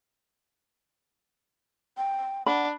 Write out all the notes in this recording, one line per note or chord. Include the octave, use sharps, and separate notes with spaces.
G5
D4 F#5 B5